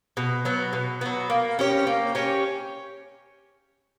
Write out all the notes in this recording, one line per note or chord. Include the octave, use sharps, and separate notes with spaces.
B2
F#3 B3
B2
F#3 B3
A#3
C#4 G4 C#5
A#3
C#4 G4 C#5